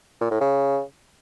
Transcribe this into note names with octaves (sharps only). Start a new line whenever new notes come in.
A#2
A2
C#3